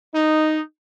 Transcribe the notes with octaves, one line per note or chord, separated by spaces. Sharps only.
D#4